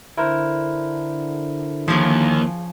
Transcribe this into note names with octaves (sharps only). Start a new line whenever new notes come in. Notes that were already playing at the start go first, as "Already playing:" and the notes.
D3 E4 A#4 C5
D#2 C#3 F3